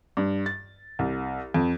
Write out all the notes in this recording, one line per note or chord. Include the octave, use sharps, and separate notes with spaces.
G2
A6
C2
F2